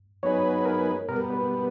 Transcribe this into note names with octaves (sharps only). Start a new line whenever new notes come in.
F#3 B3 D#4 G#4 B4 C#5
A#4
B2 G3 B3 A#4
B4